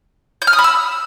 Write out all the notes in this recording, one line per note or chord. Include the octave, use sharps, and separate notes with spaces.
G6
F6
D#6
B5
E6